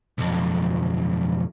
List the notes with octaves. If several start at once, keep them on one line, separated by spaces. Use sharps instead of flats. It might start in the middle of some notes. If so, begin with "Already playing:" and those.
B1 F2